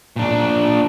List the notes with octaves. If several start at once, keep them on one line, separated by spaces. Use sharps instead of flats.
A#2 D4